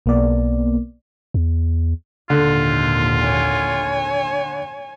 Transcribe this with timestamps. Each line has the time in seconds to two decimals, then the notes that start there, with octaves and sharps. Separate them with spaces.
0.06 B1 A#3 B3 D5
1.34 E2
2.30 G#1 D#2 A#2 D3 F4
3.23 C#5 G#5